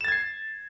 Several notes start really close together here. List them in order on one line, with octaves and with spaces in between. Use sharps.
E7 A6 G#6 C7